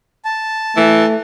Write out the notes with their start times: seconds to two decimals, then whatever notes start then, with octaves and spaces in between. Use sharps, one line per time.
0.25 A5
0.77 E3 A3